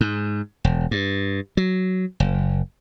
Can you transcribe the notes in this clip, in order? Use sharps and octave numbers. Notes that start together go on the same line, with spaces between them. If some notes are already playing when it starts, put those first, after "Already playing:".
G#2
E1
G2
F#3
F#1